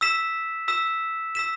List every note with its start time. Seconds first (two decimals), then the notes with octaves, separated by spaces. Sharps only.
0.01 E6 B6 E7
0.68 E6 B6 E7
1.35 E6 B6 E7